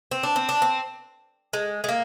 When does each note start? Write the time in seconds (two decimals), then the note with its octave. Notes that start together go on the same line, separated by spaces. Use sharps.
0.11 C4
0.23 D4
0.36 C4
0.49 D4
0.62 C4
1.53 G#3
1.84 G#3
1.89 A#3